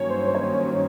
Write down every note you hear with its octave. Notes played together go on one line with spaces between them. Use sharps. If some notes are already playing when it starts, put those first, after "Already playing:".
Already playing: G2 D#3 F#3 A#3 C#4 C#5
C5
C5
C#5